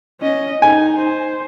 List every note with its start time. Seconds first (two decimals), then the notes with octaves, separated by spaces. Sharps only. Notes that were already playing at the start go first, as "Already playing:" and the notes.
0.21 C#4 D#5
0.62 D#4 G#5
0.98 C5